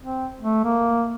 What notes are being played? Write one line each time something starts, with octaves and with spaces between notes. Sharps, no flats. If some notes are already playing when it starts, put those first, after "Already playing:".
C4
A3
A#3